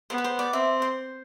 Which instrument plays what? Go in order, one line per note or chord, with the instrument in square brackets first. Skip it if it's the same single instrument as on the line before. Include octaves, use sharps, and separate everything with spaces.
[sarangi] B3 [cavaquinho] C5
[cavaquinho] B4
C5
D5
[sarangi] C4 [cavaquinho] E5
[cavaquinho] C5